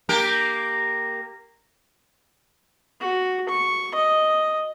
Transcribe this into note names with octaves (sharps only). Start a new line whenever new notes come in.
A#3 G4 A#4
F#4
C#6
D#5